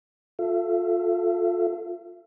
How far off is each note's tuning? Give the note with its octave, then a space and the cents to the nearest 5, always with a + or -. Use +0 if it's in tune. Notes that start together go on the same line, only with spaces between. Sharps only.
F4 +25 A4 +0 E5 +40